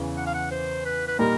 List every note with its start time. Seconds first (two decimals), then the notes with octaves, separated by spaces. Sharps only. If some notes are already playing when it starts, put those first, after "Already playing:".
Already playing: E2 C#3 E3
0.17 F#5
0.26 F5
0.34 F#5
0.51 C5
0.85 B4
1.07 B4
1.19 A#2 G3 A#3 D#4 A#4